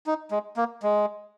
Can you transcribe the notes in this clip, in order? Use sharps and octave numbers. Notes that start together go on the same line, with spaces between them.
D#4
G#3
A#3
G#3